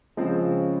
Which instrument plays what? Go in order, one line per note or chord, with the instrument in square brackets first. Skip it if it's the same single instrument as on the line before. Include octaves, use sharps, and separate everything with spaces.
[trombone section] C#3 [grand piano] F3 G#3 C4